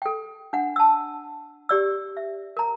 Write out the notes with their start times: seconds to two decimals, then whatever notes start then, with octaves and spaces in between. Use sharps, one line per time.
0.02 A4 G5
0.53 D4 F#5
0.76 A5 E6
1.69 G4 D5 E6
2.17 E5
2.57 A#4 A#5